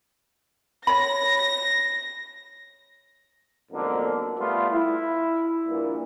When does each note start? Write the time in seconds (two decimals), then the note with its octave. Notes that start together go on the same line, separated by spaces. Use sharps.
0.87 C#5 B5 A#6
3.72 B1 F2 G#2 D3 A#3
4.38 G3 A3 B3 F4
4.71 E4
5.67 A#1 G2 A#2